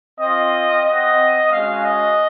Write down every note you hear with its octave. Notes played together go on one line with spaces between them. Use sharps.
C4 F4 D#5
C4 F#4 D#5
G#3 C#4 F#4 F5
D#5